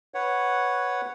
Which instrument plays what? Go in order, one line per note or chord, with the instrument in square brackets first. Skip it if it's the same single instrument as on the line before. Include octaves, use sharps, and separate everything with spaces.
[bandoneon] B4 C#5 F#5